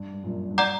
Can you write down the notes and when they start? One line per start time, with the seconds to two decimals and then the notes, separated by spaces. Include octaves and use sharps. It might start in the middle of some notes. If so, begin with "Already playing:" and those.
Already playing: G2
0.13 G2
0.24 F#2 A#2
0.51 G2
0.58 D5 F#5 A#5 D6 G6